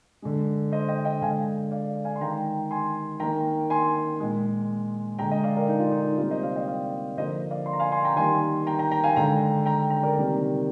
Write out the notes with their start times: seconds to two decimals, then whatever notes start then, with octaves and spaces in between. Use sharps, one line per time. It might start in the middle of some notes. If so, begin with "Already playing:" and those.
0.22 D3 G#3
0.72 C5 D#5
0.88 D#5 G5
1.05 D#5 G5
1.22 D3 G#3 F5 G#5
1.71 D5 F5
2.05 F5 G#5
2.16 C6
2.21 D#3 G#3 G5 A#5
2.71 G#5 C6
3.20 D#3 A#3 G5 A#5
3.70 G#5 C6
4.20 A#2 G#3
5.19 G#3 G5 A#5
5.22 D3
5.31 D#5 G5
5.44 D5 F5
5.57 A#4 D5
5.68 D#4
5.80 F4
5.91 D#4
6.18 C3 G3 A#3 F4
6.31 C5 D#5
6.43 D5 F5
6.55 D#5 G5
6.68 D5 F5
7.17 D3 F3 A#3 C5 D#5
7.51 D5 F5
7.66 C6
7.73 A#5
7.79 F5 G#5
7.92 G#5 C6
8.05 G5 A#5
8.16 D#3 G3 A#3 G#5 C6
8.67 G5 A#5
8.79 G5 A#5
8.91 G5 A#5
9.04 F5 G#5
9.16 D3 G#3 G5 A#5
9.66 G5 A#5
9.90 G5 A#5
10.03 A#4 D5
10.15 C3 D#3 G3 A#3